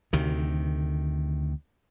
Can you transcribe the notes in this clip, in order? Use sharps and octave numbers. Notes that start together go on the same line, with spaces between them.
D2 C3 D#3